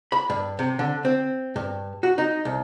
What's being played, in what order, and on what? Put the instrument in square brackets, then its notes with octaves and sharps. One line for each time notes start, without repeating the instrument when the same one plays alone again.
[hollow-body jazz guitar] B5
G2
C3
D3
C4
G2
F#4
D#4
C2